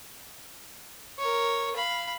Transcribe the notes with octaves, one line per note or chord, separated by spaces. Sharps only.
A#4 C#5
F5 B5